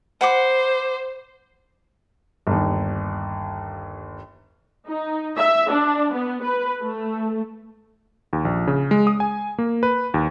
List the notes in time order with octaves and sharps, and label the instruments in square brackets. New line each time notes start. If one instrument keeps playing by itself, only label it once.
[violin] C5 [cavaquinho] F#5 B5 D6
[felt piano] G1 D#2
[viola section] D#4
E5
D4
B3
B4
A3
[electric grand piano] D#2
A#1
C#3
G#3
D#6
G#5
A#3
B4
D#2